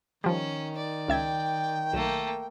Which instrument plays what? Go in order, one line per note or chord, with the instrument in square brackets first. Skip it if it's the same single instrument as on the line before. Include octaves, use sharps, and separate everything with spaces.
[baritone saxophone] D#3 [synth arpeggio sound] F3 G3 [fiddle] C#4
[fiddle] D5
[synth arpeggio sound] C#2 E5 G#6 [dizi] G5
[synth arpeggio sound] B1 [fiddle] A3 A#3